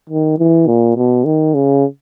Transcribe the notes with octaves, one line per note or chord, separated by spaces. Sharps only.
D#3
E3
A#2
B2
D#3
C#3